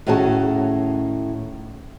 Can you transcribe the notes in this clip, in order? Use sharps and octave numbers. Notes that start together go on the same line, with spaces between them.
A2 D#3 C#4 F#4 G#4 A5